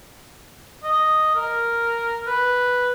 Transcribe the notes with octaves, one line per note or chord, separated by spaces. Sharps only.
D#5
A#4
B4